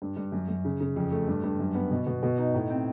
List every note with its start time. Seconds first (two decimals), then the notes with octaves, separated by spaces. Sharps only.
0.02 G2
0.17 G2
0.32 F#2
0.49 F#2
0.65 C#3
0.80 C#3
0.96 F2
1.12 A3
1.28 G2
1.44 G2
1.59 F#2
1.75 B3
1.91 B2
2.06 B2
2.23 B2
2.38 D#4
2.54 A2
2.70 C4